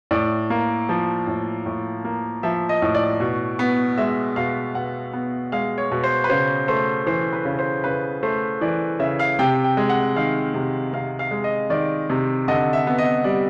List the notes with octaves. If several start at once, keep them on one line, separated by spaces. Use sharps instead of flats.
A2 D5
A#3
F3
A2
A2
A#3
F3 E5
D#5
A2
D5
B2
B3
G#3 E5
B2 F5
B2 F#5
B3
G#3 F5
C#5
B2
C5
B4
C#3 C5
A3 C5
E3 C5
B4
C#3
C5
C#3 B4
A3 C5
E3 D5
C#3 E5
F5
C3 G5
G5
G#3
F#5
D#3 F5
C3
C3 F5
F5
G#3
D#5
D#3 D5
C3
D3 D#5
E5
B3
D#5
G3 D5